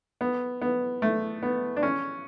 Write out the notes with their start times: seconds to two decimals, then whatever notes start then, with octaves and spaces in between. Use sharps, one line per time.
0.21 B3
0.62 B3
1.02 A3
1.43 B3
1.77 D4
1.83 C#4